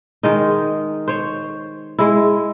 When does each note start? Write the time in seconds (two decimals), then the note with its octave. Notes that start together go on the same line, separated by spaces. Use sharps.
0.23 D#3 G#3 D#4
1.08 C5 C#5
1.99 G#3 E4